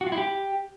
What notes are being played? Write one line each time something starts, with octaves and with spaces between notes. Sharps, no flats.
F#4
F4
E4
G4